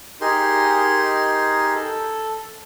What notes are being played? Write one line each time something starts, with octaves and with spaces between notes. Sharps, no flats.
D#4 G4 G#4 A#4 C6
A4